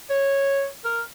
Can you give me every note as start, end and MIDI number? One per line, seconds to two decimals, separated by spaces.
0.10 0.65 73
0.85 1.01 70